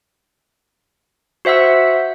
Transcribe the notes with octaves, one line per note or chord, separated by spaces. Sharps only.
F#4 C5 E5 F#5 E6